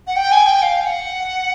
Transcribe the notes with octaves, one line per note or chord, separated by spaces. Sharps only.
F#5
G5
G#5
G5
F5
F#5